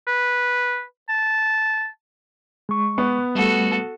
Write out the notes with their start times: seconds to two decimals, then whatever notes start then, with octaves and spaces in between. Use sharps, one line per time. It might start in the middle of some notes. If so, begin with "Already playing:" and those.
0.07 B4
1.09 A5
2.69 G#3 C#6
2.98 B3
3.35 G3 A3 F#4 A4